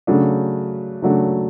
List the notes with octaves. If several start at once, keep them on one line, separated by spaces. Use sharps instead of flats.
C#3 F#3 A3 D4
C#3 F#3 A3 D4